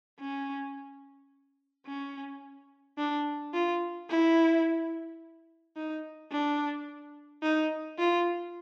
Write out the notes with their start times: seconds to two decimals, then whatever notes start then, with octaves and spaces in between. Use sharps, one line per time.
0.20 C#4
1.86 C#4
2.98 D4
3.54 F4
4.09 E4
5.76 D#4
6.32 D4
7.43 D#4
7.99 F4